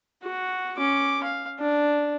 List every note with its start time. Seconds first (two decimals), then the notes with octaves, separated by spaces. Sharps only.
0.23 F#4
0.77 C#4 D6
1.24 F5
1.59 D4